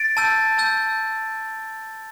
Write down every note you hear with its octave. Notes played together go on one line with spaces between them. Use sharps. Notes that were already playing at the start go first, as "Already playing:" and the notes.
Already playing: A6 D7
A5 E6 G6
A5 E6 G6